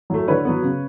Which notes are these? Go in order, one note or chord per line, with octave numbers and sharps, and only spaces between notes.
F#3 A3
D3 B4 C#5
F#3 B3
C#3